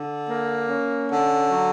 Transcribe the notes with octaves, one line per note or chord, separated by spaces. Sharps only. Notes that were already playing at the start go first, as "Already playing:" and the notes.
Already playing: D3
A#3
C#4
D3
F#3